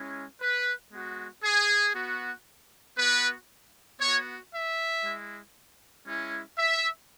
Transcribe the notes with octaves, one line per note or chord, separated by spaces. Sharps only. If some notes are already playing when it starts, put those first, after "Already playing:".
Already playing: G#3 C#4 E4
B4
G#3 B3 F#4
G#4
B3 F#4
B3 F#4 B4
B3 F#4 C#5
E5
G#3 E4
G#3 C#4 E4
E5